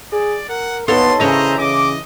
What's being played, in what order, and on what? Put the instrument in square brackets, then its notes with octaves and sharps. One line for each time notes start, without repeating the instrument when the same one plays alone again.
[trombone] G#4 [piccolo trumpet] D5
[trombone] A#4 [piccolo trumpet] F#5
[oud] D#2 A4 C#5 [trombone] B3 [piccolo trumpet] C6
[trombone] C#3 [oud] E3 C#5 [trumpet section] C5 E5 A#5 [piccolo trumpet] D#5
[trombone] C#3 [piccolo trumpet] D#5 [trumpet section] D6